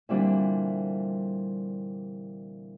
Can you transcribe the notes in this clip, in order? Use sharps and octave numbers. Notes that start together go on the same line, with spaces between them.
A#2 D3 E3 G3 C4 D4